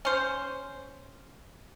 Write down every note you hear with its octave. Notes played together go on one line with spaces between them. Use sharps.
C#4 C5